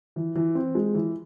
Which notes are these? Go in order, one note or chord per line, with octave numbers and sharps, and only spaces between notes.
E3
E3
C4
G#3
E3